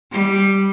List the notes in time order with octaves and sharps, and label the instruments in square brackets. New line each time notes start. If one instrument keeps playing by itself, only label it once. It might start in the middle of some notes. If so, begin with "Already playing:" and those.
[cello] G3